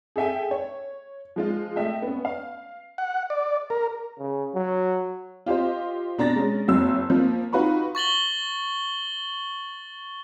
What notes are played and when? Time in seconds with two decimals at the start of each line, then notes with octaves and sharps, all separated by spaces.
0.16 G#4 A4 E5 G5 G#5
0.51 C#5
1.36 F3 G#3 F4
1.76 A3 D#5 E5 G5
2.02 B3 C#4
2.25 F5
2.98 F#5
3.30 D5
3.70 A#4
4.19 C#3
4.54 F#3
5.46 F4 G4 C5 D#5
6.18 B2 D4 A#5 A6 A#6
6.36 G#3 C#4
6.68 F#1 F2 F#3 E6
7.10 F3 A#3
7.53 D#4 F4 F#4 B4 B5 C#6
7.95 C#6 A6 F#7 G7